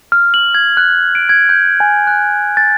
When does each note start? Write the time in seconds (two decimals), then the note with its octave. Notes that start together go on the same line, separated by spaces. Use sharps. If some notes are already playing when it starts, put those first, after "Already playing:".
0.12 F6
0.34 F#7
0.54 G#6
0.77 F#6
1.15 D7
1.29 G#6
1.49 G6
1.80 G#5
2.07 F#6
2.57 A6